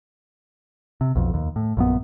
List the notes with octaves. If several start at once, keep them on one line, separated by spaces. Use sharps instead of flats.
C3
B1 F2
D#2
A2
A#1 F#2 B3